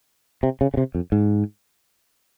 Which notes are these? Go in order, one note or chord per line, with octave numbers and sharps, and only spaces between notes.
C3
C#3
C#3
C3
F2
G#2